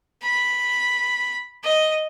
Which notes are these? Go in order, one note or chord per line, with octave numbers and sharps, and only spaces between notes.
B5
D#5